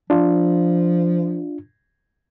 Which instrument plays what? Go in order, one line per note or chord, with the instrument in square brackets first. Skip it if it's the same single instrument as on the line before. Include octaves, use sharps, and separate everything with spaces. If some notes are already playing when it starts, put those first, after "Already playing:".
[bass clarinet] F3 [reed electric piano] D4 F4